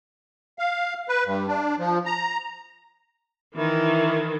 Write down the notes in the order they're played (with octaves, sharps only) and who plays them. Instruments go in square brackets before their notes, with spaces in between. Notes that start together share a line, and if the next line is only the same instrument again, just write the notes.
[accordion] F5
B4
G2
D4
F3
A#5
[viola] D#3 E3 [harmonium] E4